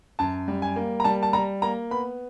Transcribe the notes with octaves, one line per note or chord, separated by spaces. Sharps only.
F#2 A5
G3
G#5
A#3
A#5
G3 A5
A5
G3 A#5
A#3 A#5
B3 B5